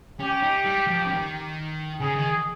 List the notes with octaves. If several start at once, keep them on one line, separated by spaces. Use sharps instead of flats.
C#4 G4
D#4
G3
F3
C#3
D#3
C#3 G#4
D#3